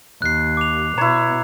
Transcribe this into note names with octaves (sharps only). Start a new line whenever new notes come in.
D#2 F#6 C7
D6 F7
B2 E4 C#5 A#5